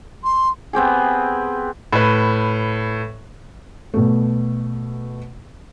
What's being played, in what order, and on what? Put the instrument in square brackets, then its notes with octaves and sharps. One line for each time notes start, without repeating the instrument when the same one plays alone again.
[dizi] C6
[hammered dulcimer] B3 C4 G4 G#4
[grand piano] A2 B4
[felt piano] B2 A3